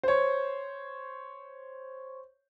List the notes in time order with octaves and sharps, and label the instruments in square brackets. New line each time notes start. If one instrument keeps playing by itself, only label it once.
[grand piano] C5 C#5